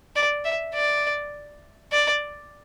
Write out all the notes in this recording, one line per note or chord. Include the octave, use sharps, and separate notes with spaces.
D5
E5
D5
D5